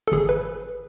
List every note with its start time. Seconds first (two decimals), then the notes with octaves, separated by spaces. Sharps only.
0.08 A4
0.12 G#1 G#4
0.29 B4